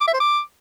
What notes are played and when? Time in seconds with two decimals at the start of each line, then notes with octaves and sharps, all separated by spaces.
0.01 D6
0.07 E5
0.14 C5
0.20 D6